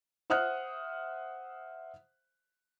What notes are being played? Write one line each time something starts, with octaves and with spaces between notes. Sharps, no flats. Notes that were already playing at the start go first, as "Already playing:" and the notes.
C5 E5 F#5 D#6 F6 F#6